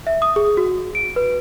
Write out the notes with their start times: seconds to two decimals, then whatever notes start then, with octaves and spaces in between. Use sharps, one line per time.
0.07 E5
0.22 D#6
0.36 G#4
0.57 F#4
0.95 D7
1.16 B4